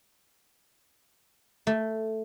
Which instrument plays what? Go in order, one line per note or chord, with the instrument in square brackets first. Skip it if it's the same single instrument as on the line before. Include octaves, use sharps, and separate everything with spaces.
[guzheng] A3